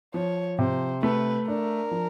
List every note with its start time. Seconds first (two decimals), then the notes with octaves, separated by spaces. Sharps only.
0.14 F3 C#5
0.59 C3 C5
1.02 A3 B4
1.47 D4 A#4
1.91 F3